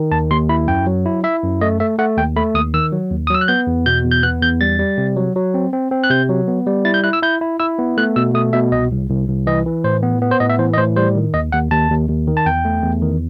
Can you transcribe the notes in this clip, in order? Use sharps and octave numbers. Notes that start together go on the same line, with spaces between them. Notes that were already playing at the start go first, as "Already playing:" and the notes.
Already playing: D#3
D#2 A5
D#2 C6
E4 B5
F#2 G5
F#3
E4
E4 E5
F#2
A3 D#5
A3 E5
A3 F#5
D#2 G5
A3 B5
D#2 D#6
D#3 E6
F#3
D#2
D#6
F#3 E6
F#6
B3 G6
E2
B2 G6
E2
G6
B3 F#6
E2 G6
G3 A6
G3
C3
F#3
F#3
C4
C4
C4
F#6
C3 G6
F#3
B3
G3
E4 A6
G6
E4 F#6
E6
E4 G6
E4
E4 E6
B3
A3 F#6
B2 E6
A3 D#6
B2 E5
C2 D#5
C2
C2
C2
E3 D#5
E3
A2 C5
B3
B3
C5
A2 D#5
E5
E3 C5
D#5
A2 C5
G3 C5
D#3
D#2 D#5
D#2 F#5
D#2 A5
D#2
D#2
D#3
A5
E2 G5
A3
E2
D#3